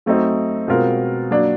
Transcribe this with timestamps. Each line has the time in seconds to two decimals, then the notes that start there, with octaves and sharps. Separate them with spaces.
0.06 F#3 A3 C4 D#4
0.68 B2 G#3 C4 F4 A#4
1.31 F#3 A#3 D4